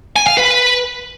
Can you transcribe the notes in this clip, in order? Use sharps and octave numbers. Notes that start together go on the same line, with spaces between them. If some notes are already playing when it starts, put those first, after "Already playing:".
G#5
F5
B4